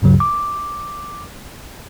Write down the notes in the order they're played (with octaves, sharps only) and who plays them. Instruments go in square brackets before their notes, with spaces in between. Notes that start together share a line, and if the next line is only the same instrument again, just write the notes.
[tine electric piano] D2 G2 C#3 F#3
D6